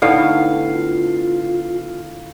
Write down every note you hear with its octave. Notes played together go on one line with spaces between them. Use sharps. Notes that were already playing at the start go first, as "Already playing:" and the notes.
A2 D3 B3 D#4 F5
F4